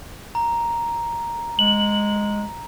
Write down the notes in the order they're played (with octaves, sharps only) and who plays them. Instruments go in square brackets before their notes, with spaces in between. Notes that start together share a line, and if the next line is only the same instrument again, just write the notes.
[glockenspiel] A#5
[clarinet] G#3 [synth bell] F#7